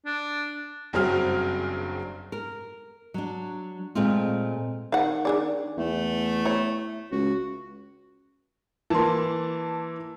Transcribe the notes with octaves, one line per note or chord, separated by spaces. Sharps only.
D4
F#1 G2 F#3 C4 G#4 F6
A#4
F#3 D4
A#2 G#3 A3 C4 F4
D#3 F5 F#5
D4 G#4 D5
E2 A3
E4 C#5
C#2 F#4
E3 A#3 A5 C6